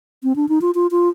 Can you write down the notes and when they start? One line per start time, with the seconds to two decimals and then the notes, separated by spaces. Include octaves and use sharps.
0.23 C4
0.36 D4
0.49 D#4
0.61 F4
0.75 F4
0.91 F4